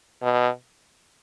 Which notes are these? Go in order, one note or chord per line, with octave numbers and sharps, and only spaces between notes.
B2